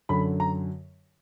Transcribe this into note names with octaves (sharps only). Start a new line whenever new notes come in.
F#2 D3 F#3 B5
A#5